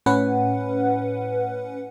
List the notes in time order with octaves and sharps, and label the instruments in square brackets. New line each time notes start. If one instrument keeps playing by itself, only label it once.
[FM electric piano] A2 C#4 B4 F#5